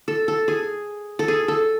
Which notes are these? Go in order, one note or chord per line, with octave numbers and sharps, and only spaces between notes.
A4
A4
G#4
A4
G#4
A4